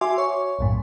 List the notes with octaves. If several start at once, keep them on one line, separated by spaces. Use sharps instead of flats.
F#4 E5 G#5 C6 D6
C#5 C#6
B1 F#2 A2